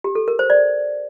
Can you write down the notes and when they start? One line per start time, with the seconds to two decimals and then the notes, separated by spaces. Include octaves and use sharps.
0.04 G4
0.15 A4
0.28 A#4
0.39 C5
0.50 D5